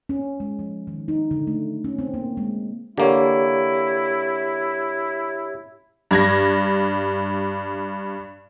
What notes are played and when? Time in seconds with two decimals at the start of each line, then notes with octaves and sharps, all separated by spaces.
0.09 C#4
0.40 G#3
0.59 F3
0.87 D#3
1.08 D#4
1.31 D3
1.47 A3
1.84 C#4
1.99 C4
2.14 A#3
2.37 G#3
2.98 D3 A#3 E4 G4 C#5
6.11 G2 G#6 A#6